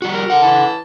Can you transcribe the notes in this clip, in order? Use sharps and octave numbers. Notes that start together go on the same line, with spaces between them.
G3 F#4
A#4
A4 F#5
E3 A5